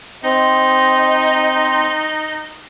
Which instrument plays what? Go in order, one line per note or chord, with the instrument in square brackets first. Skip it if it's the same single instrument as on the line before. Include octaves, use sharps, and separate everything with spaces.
[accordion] C4 [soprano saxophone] D#4 [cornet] D#5